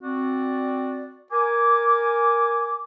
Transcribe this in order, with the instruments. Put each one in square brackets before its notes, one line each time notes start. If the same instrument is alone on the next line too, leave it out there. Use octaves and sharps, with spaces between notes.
[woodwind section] C4 F#4 D5
A#4 G#5 D6